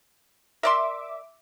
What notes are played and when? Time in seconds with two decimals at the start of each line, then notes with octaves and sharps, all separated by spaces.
0.63 A#4 D5 E5 C6 D6